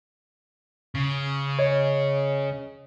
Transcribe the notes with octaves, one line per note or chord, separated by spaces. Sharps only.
C#3
C#5 D#5